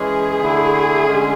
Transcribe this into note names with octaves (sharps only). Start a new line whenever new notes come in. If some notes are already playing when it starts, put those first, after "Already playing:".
Already playing: E3 G#3 C#4 G#4
D3 A3 E4
D3 G#3 C#4